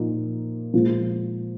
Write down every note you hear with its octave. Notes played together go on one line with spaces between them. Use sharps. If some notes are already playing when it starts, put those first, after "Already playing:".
Already playing: A#2 F3 A#3 D#4
A#2 F3 G#3